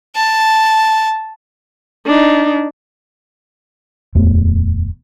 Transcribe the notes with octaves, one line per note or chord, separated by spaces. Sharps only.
A5
D4 D#4
D#1 F2 A3 B3